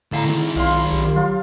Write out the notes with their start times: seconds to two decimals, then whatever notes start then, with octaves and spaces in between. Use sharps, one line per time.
0.12 A2 D3 E4 F5 A5 A#5
0.26 D#3 C4
0.56 B1 F4 F5 C6
0.92 B1 G4
1.16 F#3 F4